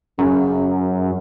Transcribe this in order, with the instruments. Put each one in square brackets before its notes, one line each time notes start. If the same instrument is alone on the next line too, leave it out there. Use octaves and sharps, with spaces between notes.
[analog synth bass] F#2 [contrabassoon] C#3